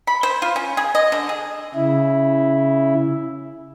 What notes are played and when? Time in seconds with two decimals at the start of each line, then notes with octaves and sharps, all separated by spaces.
0.07 B5
0.23 C5
0.42 F4
0.56 C#4
0.77 G#4
0.95 D#5
1.12 D3
1.29 G#4
1.75 C#3 E4